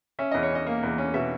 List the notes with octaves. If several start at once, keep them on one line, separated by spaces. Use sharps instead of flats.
C#4 E5
E2 D#5
C#5
C#4 D#5
A#3
E2
C#4
B2 E5